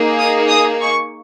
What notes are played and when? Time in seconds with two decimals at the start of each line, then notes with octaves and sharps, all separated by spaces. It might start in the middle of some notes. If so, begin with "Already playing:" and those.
Already playing: A#3 D#4 G#4
0.19 D#6
0.50 D#6
0.81 C#6